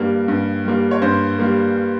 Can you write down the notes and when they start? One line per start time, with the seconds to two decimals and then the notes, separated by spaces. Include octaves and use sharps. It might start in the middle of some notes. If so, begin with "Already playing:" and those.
Already playing: G2 G3 A#3
0.28 G2
0.65 G3 A#3
0.91 C#5
1.02 G2 C5
1.39 G3 A#3